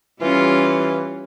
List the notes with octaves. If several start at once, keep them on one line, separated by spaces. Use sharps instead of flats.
E3 G3 C#4 F4